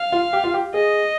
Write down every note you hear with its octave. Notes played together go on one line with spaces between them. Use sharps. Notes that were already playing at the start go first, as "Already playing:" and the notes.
Already playing: F5
F4
G4
F4
G4
G#4 D#5